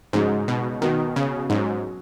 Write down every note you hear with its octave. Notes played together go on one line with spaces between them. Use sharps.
G#2 C#3 G#3 D#4 F#4
B2
B2 D#3 B3 F#4
C#3
G#2 F#3 C#4 F#4